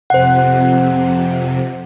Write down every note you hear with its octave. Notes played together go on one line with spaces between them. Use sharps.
F2 C3 C5 F#5